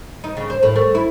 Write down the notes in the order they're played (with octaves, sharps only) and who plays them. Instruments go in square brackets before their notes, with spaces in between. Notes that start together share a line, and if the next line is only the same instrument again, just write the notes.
[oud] D#4
C#3
C5
A2
A3
E4